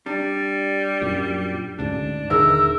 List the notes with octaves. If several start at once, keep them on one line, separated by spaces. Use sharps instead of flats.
G3 D4
F#2 A#2
D2 G#2 C#3 D4
D#1 D3 D#3 G#4 A#4 C5 E5 E6